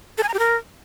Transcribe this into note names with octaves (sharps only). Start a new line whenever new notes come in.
A4
G#5
A#5
G4
A#4